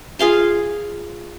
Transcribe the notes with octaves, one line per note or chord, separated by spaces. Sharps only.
F4 G#4 F5 C6